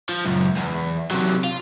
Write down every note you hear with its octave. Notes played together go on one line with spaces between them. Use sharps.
F3
C#2 F#2
E2
C3 F#3
F4